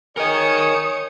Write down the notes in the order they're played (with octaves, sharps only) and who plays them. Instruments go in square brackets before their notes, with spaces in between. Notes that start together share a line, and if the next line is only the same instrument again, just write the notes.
[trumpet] G#4 [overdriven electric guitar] A#4 D#5 [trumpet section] C#5 [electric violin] D#6 C#7